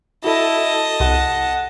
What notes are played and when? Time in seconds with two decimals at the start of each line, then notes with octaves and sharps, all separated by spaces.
0.24 E4 F#4 A4 D#5 A5
1.00 C2 F#5